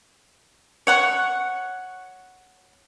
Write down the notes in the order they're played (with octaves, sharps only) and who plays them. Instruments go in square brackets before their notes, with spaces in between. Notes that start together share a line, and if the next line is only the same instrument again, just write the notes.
[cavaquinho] C#5 F#5 C#6